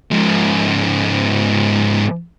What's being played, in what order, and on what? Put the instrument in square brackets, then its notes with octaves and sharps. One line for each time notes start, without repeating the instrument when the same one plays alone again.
[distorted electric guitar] G#2 F3